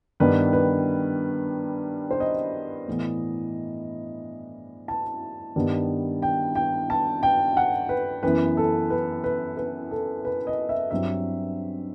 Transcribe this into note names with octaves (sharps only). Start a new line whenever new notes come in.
G2 D#3 G3 B3 B4
B4
C5
D#5
A2 E3 B3
A5
G2 D#3 G3 B3
G5
G5
A5
G5
F#5
B4
F#2 E3 B3 B4
A4
B4
B4
B4
A4
B4
D#5
E5
G2 F#3 C4 E5